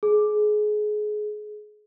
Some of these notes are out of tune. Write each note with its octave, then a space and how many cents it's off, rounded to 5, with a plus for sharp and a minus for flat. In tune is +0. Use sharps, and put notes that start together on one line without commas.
G#4 +25